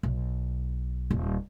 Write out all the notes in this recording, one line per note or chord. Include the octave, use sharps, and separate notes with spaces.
B1
D#1